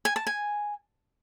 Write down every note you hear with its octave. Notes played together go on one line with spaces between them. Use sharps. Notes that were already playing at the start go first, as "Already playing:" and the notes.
G#5
A5
G#5